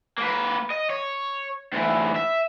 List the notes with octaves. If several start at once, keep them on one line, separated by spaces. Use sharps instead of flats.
A#3 B4
D#5
C#5
D2 E3
E5